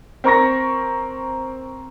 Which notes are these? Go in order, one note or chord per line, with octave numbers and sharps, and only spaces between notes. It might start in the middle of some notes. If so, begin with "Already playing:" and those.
C4 A#4 C#6 A#6